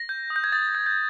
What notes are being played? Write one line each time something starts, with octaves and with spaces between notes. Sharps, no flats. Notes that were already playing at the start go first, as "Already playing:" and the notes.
Already playing: A#6
G6
D#6
G6
G#6
D#6 A6
G6
G6